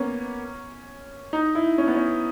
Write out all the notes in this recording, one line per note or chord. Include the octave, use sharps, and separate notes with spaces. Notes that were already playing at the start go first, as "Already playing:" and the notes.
Already playing: A#3 B3 C#4
D#4
E4
C#4
B3
C#4